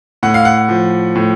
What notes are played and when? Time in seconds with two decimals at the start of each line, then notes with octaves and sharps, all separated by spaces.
0.23 A2 F#5
0.34 F5
0.45 F#5
0.69 F3
1.15 A2